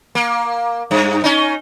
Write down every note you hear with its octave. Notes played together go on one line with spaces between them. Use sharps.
A#3
G2
C#4 D#4